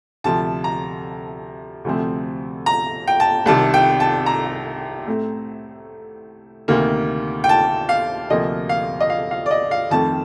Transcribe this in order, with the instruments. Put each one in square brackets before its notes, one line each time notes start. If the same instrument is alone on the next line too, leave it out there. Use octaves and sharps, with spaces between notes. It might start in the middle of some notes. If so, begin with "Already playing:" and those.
[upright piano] D2 C3 F3 A5
A#5
D2 C3 F3 A3 C4
A#5
G5
A5
C2 C3 D#3 A5
G5
A5
A#5
A2 A3 C4
D2 C3 D#3 A#3
G5
A5
F5
D2 C3 F3 A#3 D#5
F5
D#5
F5
F5
D5
D#5
F5
F2 D#3 A3 C4 A5